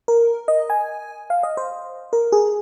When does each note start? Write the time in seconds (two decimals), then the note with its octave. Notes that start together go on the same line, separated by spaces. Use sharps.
0.08 A#4
0.48 D#5
0.70 G#5
1.30 F5
1.43 D#5
1.57 C5
2.13 A#4
2.32 G#4